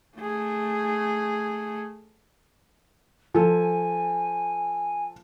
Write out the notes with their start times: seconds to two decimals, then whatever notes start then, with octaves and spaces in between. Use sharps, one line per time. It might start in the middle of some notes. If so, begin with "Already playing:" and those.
0.18 A3 G#4
3.35 F3 A4 G#5